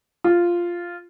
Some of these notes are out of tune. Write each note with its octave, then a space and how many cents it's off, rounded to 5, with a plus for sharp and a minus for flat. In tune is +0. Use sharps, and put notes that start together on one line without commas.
F4 -5